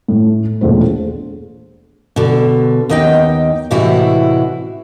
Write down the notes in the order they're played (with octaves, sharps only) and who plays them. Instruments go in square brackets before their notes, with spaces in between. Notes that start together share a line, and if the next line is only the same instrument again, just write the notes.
[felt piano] A2
E1 A#1 A3 C5
[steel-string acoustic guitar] B2 D3
D#2 B3 D#4 D#5 G5
A2 C3 E3 G#3 E4 F#4